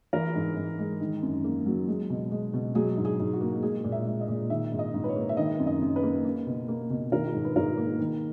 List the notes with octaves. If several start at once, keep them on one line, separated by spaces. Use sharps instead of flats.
E3 A#4
G#2
G#2
G#3
D#3
F#2
A#3
F#3
G#3
B2
G#3
B2
F#3 G#4
G#2
G#4
G#2
F#4
A#3
G#3 G#4
A#2
E5
G#3
D#5
A#2
D#3 E5
G#2
D#5
G#2
B4
C#5
A#3
E5
D#3 D#5
F#2
D#5
F#2
B4
A#3
A#3
B2
A#3
B2
D#3 A#4
G#2
B4
G#2 A#4
A#3
D#3